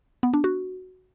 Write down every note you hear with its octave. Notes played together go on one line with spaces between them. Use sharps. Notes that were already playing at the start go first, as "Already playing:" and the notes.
B3
D4
F#4